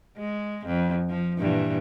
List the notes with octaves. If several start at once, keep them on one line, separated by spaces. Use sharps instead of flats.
G#3
F2
F3
G2 A#2 E3